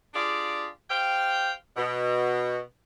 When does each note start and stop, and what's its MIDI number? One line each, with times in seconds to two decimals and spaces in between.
0.14 0.67 62
0.14 0.67 65
0.14 0.67 67
0.14 0.67 68
0.14 0.67 74
0.90 1.51 67
0.90 1.51 72
0.90 1.51 77
0.90 1.51 79
1.77 2.58 47